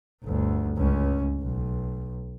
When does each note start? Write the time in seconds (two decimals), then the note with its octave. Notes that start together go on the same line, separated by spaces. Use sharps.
0.23 G1 D2
0.77 C#2 C#4
1.41 B1